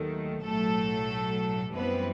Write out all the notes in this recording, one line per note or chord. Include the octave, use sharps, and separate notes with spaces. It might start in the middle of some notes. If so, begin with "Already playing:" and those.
Already playing: D#2 D#3 F#3 A3
B1 A2 F#3 A3 A4
F#2 E3 G3 B3 C4 B4